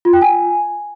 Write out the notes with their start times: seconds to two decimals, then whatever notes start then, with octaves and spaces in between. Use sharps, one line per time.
0.05 F4
0.13 G5
0.22 G#5